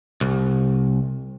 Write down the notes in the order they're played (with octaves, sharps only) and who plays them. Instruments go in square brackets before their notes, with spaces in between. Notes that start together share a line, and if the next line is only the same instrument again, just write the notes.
[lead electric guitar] C2